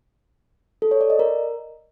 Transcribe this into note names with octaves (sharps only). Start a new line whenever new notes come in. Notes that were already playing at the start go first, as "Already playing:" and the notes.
A4
C#5
D5
D#5
A#4